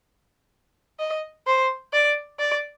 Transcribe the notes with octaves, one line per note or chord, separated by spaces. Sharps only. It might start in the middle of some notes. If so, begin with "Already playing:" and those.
D#5
C5
D5
D5